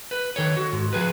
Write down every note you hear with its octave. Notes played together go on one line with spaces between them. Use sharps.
B4
D#3 A4 C#5
F#4
G#2
F3 G#4 B4